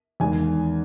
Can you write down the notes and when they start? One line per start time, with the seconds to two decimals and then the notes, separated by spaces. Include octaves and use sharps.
0.20 E2 D#3 G#3 G#5